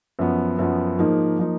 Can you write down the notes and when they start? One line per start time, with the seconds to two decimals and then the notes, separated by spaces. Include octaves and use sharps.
0.19 F#2 F3 B3
0.59 F#2 F3 B3
0.98 G#2 F3 A#3 D#4
1.39 F3 A#3 D#4